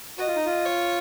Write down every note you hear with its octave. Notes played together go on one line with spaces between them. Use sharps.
F#4 D#5
F4
D#4
F4
C#5